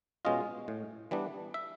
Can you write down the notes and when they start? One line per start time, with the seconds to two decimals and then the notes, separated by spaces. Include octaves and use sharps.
0.25 B2 G#3 C#4 F4 D#5
0.68 A2
1.11 E3 G3 B3 D4
1.54 E5